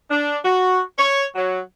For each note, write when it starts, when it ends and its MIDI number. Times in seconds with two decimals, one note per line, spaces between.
0.11 0.38 62
0.45 0.81 66
0.97 1.26 73
1.35 1.59 54